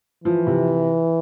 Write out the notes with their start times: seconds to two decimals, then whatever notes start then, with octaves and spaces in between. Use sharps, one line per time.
0.24 E3 F3
0.47 C3